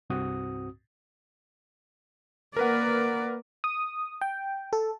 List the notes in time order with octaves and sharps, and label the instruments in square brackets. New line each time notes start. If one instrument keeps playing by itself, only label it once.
[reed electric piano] C2 G2 C4 F#4 D#6
[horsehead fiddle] A#3 D5 [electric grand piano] A#4 B4 F#5
[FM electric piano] D#6
G5
A4